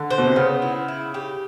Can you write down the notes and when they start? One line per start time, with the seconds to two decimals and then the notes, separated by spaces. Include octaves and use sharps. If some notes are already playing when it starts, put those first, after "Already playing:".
Already playing: D3
0.10 C5
0.18 B2
0.27 C3
0.36 C#3 B3
0.62 E4
0.88 E4
1.14 G4